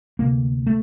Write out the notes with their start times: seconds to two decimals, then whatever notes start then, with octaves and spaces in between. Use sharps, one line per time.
0.19 D2 C3 A#3
0.67 A3